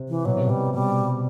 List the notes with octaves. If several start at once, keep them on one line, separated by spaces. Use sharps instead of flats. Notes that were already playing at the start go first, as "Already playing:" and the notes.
Already playing: C3
E3
B2 F#3
C3
B2 G3
B2 G3